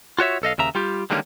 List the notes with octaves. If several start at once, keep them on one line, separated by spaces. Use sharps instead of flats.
F4 F#4 C#5 E5
B1 A4 D#5 F5
D#2 C#3 E5 A#5
G3 F4 G4
D3 D#3 G3 G#3 A#3 C#4